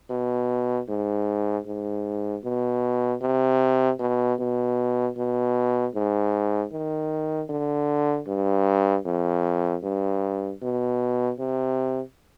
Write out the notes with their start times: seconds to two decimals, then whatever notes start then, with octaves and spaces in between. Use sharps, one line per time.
0.11 B2
0.88 G#2
1.66 G#2
2.44 B2
3.22 C3
3.99 B2
4.39 B2
5.17 B2
5.95 G#2
6.73 D#3
7.50 D3
8.27 G2
9.06 F2
9.83 G2
10.62 B2
11.39 C3